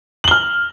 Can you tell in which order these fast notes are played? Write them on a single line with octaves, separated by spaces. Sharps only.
F#7 G7 F6